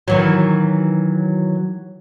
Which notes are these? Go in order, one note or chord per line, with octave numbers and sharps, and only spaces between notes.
D#3 E3 F#3